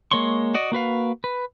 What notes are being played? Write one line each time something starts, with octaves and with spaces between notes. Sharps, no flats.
G#3 A#3 C#5 C6 C#6
F#4 D5 D#5
A#3 F#4 B4 F5
B4